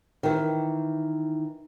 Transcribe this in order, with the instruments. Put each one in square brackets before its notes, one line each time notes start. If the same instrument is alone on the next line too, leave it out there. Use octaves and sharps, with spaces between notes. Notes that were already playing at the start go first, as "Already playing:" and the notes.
[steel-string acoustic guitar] D#3 E3